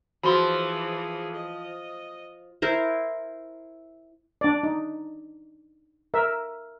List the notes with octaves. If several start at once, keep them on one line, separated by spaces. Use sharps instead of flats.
E3 F3 F#4 G#4 B5 C6
D#5
E4 A#4 C5
D4 D5
D#4
A#4 E5